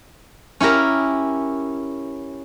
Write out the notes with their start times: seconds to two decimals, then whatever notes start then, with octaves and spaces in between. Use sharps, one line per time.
0.60 C#4 E4 G4 A#4